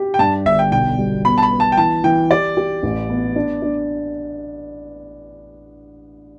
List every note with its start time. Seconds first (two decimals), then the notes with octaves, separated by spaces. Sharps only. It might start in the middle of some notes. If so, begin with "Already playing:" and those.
Already playing: G4
0.14 G5
0.19 G2 A5
0.45 G1 E5
0.59 G5
0.72 B1 G5
0.98 G3
1.25 B3 B5
1.38 A5
1.43 B5
1.51 B3
1.60 A5
1.72 G5
1.77 E3 A5
2.04 E3 G5
2.30 G4 D5
2.57 G4
2.83 A1
3.10 B3
3.36 D4
3.62 D4